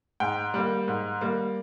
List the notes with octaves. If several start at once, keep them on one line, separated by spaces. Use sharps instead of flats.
G#2 G5
G3 A#3
G#2
G3 A#3